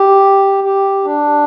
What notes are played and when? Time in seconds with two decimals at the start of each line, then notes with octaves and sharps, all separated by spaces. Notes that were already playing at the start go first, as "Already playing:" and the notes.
Already playing: G4
0.64 G4
1.04 D4